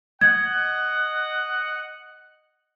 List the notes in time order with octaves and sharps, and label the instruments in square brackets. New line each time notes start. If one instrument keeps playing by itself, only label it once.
[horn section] D#5 F#5 [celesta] G#6